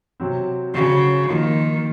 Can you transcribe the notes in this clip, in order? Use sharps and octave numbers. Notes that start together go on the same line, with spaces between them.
C3 F#3 C4
C#3 F#3 C4 F#4
D#3 F3 A#3 F4